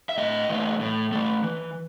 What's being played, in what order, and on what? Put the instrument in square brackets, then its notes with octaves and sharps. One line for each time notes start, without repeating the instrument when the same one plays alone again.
[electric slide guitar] E5
A2 D#5
E3 A3
A2
E3 A3
E3